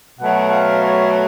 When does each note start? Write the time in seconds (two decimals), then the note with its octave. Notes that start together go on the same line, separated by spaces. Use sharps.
0.19 B2 F#3 A3 F#5
0.49 F5
0.80 C#5